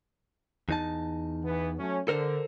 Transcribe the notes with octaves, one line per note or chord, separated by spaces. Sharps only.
E2 D#4 A5
E3 B3
F#3 A3 C#4
D3 A4 A#4 C5